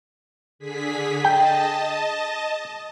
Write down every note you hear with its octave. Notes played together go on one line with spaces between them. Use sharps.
D3 G#4 B6
D#5 G5 A5